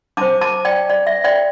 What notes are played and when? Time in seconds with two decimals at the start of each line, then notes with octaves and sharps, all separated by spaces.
0.17 D4 A5 D6
0.21 C5
0.41 A5 D6
0.65 D5 G5
0.90 D5
1.07 E5
1.24 D5 G5